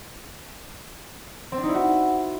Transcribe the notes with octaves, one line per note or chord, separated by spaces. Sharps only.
C4
D4
D#4
E4
F#4